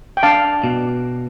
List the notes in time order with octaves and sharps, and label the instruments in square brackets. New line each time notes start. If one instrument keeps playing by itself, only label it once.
[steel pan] G5
[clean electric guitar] D4 [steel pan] F5 A5
[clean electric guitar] B2